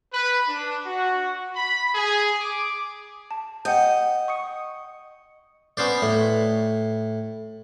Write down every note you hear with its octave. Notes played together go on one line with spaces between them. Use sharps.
B4
D4
F#4
B5
G#4
D6
A5
D#5 F#5 G5 G6
C#6 D#6 C#7
B3 C#4 C5 D5
A2